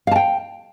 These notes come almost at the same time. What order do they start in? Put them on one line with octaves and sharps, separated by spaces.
F5 A5 G5